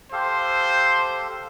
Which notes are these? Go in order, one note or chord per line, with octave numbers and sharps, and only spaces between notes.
G4 A4 C5 F5